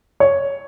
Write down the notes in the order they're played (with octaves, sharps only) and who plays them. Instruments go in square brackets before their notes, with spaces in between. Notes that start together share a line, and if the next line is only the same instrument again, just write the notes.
[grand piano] C#5